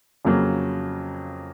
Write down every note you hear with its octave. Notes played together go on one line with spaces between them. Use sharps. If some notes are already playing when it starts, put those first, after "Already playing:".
F2 C#3 F#3 A#3